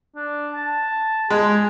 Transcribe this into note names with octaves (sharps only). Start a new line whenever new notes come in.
D4
A5
G#3 G#4